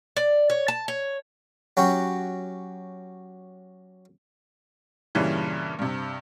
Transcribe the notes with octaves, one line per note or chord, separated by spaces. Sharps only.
D5
C#5
A5
C#5
F#3 C#4 F#4 G4
G2 A#2 C#3 E3 G3
G2 C3